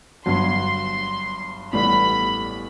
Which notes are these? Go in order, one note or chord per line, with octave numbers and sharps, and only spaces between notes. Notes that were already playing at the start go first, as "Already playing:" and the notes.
G1 G2 F#3 C6
A1 A2 G3 B3 B5